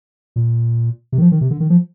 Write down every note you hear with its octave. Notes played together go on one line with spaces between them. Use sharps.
A#2
C3
D#3
F3
D#3
C3
D3
D#3
F3